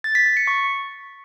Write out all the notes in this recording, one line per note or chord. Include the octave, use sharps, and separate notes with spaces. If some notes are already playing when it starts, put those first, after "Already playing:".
A6
B6
A6
C#7
C#6